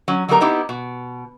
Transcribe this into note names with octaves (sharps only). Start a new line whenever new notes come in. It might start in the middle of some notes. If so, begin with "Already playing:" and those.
F#3 C#4
F#3 G3 A3 B3 A#4 A#5
B3 C4 D#4 E4 G4
B2